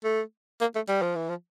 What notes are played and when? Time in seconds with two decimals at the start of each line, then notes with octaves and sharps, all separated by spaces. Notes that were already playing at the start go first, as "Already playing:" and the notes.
0.04 A3
0.61 A#3
0.75 A3
0.88 G3
1.02 F3
1.16 E3
1.29 F3